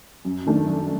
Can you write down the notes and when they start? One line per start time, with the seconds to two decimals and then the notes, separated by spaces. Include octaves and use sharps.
0.25 F#2
0.47 D#3 A3 D4
0.68 F#2